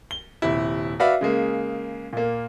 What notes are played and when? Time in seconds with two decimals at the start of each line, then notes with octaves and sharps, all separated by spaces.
0.11 G7
0.42 D#1 C3 E4
1.00 F#4 B4 D5 E5 F5
1.21 C#3 G#3 A#3
2.13 A#2 A#3